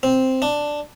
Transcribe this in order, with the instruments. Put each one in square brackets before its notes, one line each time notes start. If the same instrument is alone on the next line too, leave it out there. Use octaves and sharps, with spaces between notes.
[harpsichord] C4
D4